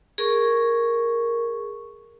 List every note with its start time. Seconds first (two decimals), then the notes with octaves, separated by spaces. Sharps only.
0.18 G#4 A#4 C#6